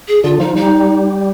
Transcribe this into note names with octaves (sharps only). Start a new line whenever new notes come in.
G#4
D3 F4
F3 D#4
G3 D#4